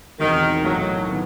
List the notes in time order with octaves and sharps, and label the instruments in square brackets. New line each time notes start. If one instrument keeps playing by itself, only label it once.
[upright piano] E1 E2 C3 [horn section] D#3
[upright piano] B1 A2 E3 A3 D#4 [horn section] F#3
[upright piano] D#3 B3